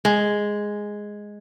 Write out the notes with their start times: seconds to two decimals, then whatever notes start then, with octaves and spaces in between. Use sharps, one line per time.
0.05 G#3